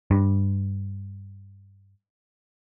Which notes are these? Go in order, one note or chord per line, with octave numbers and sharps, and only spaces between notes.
G2